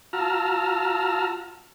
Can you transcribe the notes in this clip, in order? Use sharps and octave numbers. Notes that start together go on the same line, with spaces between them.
F4 F#4 A5 A#5 E6 F6